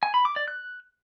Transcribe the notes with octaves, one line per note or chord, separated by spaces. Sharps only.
G#5
B5
D6
D5
F#6